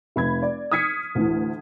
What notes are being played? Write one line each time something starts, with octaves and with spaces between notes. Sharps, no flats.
F1 B5 G#6
D5
D#6 F6 G#6 B6 C#7
D2 A2 E3